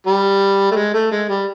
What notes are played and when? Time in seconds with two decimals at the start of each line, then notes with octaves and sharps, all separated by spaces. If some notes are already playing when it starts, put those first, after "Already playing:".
0.07 G3
0.71 A3
0.76 G#3
0.94 A3
1.11 G#3
1.29 G3